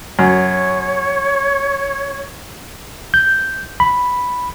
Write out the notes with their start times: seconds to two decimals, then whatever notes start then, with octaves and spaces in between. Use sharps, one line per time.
0.19 F#2 C#5
3.14 G6
3.80 B5